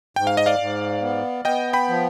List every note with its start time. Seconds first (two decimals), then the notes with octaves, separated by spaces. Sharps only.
0.16 G#2 G5
0.27 F5
0.37 D#5
0.46 D5 F5
0.59 G#2
1.02 B3
1.45 B3 D#5 G5
1.73 G5 B5
1.88 F3